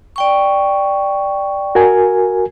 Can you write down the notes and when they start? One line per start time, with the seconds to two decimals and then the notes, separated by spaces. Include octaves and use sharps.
0.16 D5 G5 C#6
1.75 F#4 A#4 G#5